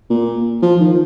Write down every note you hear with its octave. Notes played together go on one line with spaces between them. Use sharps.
A#2
F3
D#3